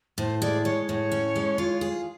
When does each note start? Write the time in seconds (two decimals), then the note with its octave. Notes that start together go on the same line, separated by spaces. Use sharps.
0.18 A2 C5
0.42 G#3 D5
0.65 G#3 C#5
0.88 A2 C#5
1.12 C#4
1.36 G#3
1.58 F4
1.81 G#4